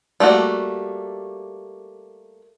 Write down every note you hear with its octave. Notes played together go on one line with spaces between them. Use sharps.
G3 A3 A#3 F#4